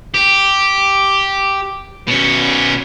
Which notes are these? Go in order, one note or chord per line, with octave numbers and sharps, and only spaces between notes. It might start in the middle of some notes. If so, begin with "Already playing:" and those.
G4
B2 C#4